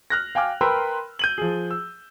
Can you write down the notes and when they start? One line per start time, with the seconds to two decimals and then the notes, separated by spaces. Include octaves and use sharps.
0.10 F6 F#6 A#6
0.35 F5 G5 G#5 D6 F6
0.61 A#4 B4 G5 B5 C6 E6
1.19 G6 D#7 F#7
1.38 F3 G#4
1.71 E6